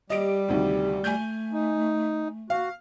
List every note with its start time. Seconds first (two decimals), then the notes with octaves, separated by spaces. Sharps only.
0.10 G3 G4 D#5 D7
0.49 D2 C3 D#3
1.04 A3 G#5 G6
1.53 D#4
2.50 F#4 F5